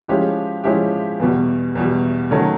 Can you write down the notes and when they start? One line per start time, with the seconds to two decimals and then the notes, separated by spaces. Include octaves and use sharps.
0.08 F3 G#3 C#4 E4 G4
0.64 F3 G#3 C#4 E4 G4
1.20 E2 B2 G3
1.75 E2 B2 G3
2.31 D#3 F#3 A3 C#4